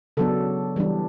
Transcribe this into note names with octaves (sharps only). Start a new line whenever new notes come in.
C#3 F#3 B3 D4 A4
E3 G3 D4